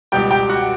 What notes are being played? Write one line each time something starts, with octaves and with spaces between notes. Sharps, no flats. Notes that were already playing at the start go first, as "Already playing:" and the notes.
C#2 B2 G3 G4 G5
G4 G5
F#4 F#5